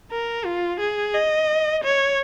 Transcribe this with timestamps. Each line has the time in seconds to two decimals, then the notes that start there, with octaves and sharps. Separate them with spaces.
0.11 A#4
0.45 F4
0.80 G#4
1.14 D#5
1.84 C#5